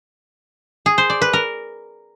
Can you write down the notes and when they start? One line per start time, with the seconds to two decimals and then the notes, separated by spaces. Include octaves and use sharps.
0.86 G#4
0.98 C5
1.10 D5
1.22 B4
1.33 A#4